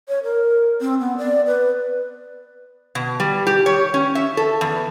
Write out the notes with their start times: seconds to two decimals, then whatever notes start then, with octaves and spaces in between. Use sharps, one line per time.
0.08 C#5
0.24 A#4
0.81 C4
1.00 B3
1.18 D5
1.46 B4
2.95 B2
3.20 G3
3.47 G4
3.66 C#5
3.94 C#4
4.15 E5
4.37 A4
4.61 E2